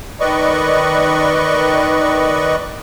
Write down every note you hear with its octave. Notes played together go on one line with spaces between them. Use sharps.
D#3 B4 D5 D#5 C#6